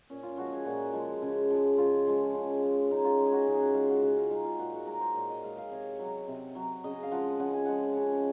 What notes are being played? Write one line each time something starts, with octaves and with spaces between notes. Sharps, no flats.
A#2 C#4
F4
F3 G#3 F#4
G#4
A#2 F#4
F3 G#3
C#3
F3 G#3
C#3 F4
F3 G#3
C#3
G#3
C#3 D#4
F4
G#3
G#4
F#4
C#3 D#4
G#4
F#4
G#3 F4
F#4
C#3 F#4
F4
G#3 D#4
F4
A#2 F#4
F#4
G#3 A#4
C5
A#2 C#5
D#5
G#3 F5
F5
C3 C#5
F#3
C3
F#3
C#3 D#5
F5
F3 G#3 F#5
C#3 F#5
G#5
F3 G#3 F#5
C#3